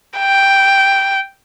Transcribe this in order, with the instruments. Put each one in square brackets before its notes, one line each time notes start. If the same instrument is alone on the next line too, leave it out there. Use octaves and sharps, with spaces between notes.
[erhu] G5